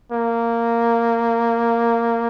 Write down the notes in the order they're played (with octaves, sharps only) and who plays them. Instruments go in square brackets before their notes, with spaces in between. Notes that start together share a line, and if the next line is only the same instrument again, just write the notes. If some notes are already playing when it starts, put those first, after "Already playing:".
[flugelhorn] A#3